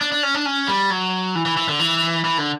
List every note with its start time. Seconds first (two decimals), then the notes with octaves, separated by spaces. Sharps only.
0.01 D4
0.12 D4
0.23 C#4
0.34 D4
0.45 C#4
0.68 G3
0.90 F#3
1.35 E3
1.46 E3
1.57 E3
1.69 D3
1.79 E3
2.25 E3
2.38 D3